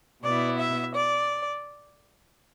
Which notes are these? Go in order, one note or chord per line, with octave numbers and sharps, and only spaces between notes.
B2 B3 E4 D5
E5
D5